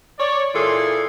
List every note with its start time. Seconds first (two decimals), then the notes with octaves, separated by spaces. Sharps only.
0.19 C#5 D5
0.55 A#2 E3 G#4 A4 C6